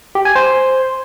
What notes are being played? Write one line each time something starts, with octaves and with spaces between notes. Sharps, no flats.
G4
G#5
C5